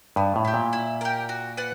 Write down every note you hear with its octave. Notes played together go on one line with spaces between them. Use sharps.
G2 B3
A2
E4 G4
A#2
E4
G4 A#4
F#4
B4 D5 F#5